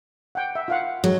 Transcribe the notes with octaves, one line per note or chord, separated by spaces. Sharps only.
F#5 G5
E5
F4 F5 F#5
F#3 G#3